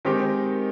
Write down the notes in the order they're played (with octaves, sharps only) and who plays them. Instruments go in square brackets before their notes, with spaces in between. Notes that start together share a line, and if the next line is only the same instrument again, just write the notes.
[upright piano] D#3 G#3 C4 D#4 G4